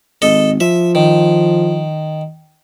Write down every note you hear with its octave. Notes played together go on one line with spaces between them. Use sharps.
G#1 A4 D#5
F3 E5
D#3